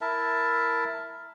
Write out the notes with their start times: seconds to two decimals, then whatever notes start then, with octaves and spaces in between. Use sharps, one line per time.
0.01 E4 A#4 E5 A5